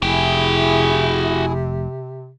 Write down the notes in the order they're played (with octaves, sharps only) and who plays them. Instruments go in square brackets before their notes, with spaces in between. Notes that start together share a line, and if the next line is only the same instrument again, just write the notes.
[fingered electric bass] F1 [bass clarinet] C3 [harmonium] E4 G#4 [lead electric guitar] F#4 G5